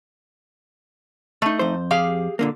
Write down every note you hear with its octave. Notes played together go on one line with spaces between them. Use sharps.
A3 D#4
F2 C5
G4 G#4 F5
A#2 D3 A#3